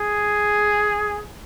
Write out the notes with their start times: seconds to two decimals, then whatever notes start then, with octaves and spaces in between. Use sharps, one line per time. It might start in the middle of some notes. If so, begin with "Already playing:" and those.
Already playing: G#4